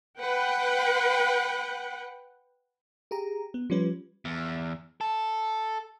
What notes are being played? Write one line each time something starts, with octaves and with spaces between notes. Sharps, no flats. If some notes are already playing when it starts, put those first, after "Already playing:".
B4 F#5 G5
G4 G#4 A#5
B3
F3 G3 C#4 B4
E2
A4